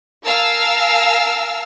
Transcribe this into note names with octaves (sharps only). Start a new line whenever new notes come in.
A#4 F5 G#5 A5 E6 F6